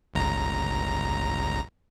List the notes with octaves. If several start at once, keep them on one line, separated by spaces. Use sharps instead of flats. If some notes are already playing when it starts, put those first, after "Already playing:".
G1 C#2 A#5